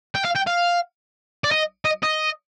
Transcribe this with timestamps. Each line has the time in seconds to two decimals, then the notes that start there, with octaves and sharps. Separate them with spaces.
0.15 G5
0.25 F5
0.36 G5
0.47 F5
1.44 D5
1.51 D#5
1.85 D#5
2.03 D#5